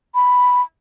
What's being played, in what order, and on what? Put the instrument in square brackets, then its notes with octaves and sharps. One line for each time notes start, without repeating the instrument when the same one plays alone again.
[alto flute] B5